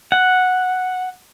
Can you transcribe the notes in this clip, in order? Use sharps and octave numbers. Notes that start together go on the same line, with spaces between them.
F#5